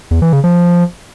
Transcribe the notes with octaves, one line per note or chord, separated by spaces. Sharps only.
E2
E3
C#3
F3